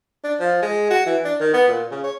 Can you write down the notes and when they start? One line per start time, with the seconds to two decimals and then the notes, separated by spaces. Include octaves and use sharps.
0.24 D4
0.40 F3
0.62 G#3
0.91 F#4
1.06 E3
1.25 D4
1.40 D#3
1.54 B3
1.68 A#2
1.91 C#3
2.04 C#5